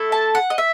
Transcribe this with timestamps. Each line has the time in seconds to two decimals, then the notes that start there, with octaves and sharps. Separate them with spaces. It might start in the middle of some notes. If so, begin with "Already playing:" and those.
Already playing: A3 E4 A4
0.12 A5
0.35 F#5
0.50 D#5
0.58 E5